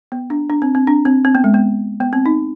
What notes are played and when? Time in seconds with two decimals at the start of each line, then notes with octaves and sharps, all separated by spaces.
0.12 B3
0.30 D4
0.50 D4
0.62 C4
0.75 C4
0.87 D4
1.05 C4
1.25 C4
1.35 B3
1.44 G#3
1.54 B3
2.00 B3
2.13 C4
2.26 D#4